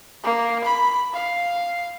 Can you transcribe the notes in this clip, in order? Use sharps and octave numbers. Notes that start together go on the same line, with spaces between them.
A#3
B5
F5